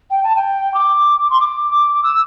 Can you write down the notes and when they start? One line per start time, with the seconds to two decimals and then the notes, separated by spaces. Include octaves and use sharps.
0.11 G5
0.24 A5
0.36 G5
0.74 D6
1.30 C6
1.40 D6
2.03 E6